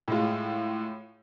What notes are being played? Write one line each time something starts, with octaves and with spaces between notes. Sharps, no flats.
A2 G#3 F4